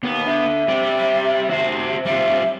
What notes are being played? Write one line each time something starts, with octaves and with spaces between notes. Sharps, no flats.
D#2 B3
D3 E5
C3 G4 D5
F#4 C5
G3 F4 E5